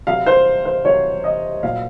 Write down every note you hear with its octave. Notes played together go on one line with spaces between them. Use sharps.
C3 F#3 F5
C5
C5
C3 F#3 C#5
D#5
A#2 F#3 F5